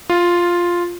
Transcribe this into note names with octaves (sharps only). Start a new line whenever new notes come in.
F4